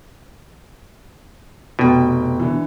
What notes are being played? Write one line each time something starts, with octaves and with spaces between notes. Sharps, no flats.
F1 B2 G5
D3 E3